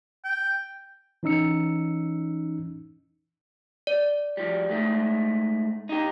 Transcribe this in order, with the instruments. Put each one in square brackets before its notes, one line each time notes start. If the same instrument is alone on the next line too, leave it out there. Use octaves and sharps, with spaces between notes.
[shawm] G5
[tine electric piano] E3 C#4 D#4 E6 C#7
[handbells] D5
[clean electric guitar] F3 G3
G#2 A3
D#4 G4